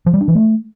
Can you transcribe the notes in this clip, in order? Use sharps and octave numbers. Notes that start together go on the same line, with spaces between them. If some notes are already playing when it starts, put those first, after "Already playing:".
F3
G3
D4
E3
A3